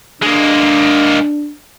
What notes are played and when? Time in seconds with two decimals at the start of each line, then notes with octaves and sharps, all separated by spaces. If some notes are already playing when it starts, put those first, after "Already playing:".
0.22 G#3 A#3 D4